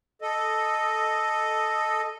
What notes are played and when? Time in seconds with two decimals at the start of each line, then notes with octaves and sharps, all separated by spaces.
0.22 A4 D#5